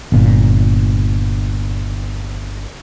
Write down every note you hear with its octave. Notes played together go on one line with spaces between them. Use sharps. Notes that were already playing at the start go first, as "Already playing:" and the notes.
G1 A#2